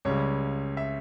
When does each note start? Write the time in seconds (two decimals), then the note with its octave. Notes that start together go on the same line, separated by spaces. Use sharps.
0.05 C#2 C#3 G3 C#5
0.77 E5